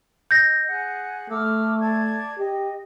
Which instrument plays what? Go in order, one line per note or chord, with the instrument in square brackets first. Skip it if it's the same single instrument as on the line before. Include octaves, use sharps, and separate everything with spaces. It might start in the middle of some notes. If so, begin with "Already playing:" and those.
[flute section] D#5 [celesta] G6 A#6
[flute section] G#4 F#5 F#6
[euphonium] A3 [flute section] D6 E6 F6
[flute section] D5 A5 G#6
[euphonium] G4 [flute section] D#5